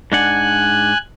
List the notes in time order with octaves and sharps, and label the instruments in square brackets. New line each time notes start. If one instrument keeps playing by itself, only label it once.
[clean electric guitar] G#2 D4 F#5 [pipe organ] G#5 F#6